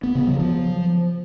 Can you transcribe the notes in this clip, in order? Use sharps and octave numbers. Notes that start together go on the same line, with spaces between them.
B3
C#3
F#3
F3